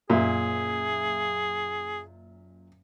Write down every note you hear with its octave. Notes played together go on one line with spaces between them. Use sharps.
F#1 A#2 G#4 E5